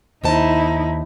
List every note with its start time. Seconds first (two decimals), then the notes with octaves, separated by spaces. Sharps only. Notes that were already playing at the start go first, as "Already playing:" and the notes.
0.24 D#2 D#4 E4 C5 A5